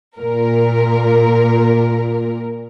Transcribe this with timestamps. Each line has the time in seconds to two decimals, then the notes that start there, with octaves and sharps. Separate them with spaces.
0.17 A#2 A#4